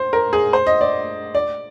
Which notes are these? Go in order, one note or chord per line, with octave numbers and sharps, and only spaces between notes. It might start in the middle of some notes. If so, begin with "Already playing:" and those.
Already playing: C5
A#4
G#4
C5
D#5
D5
D5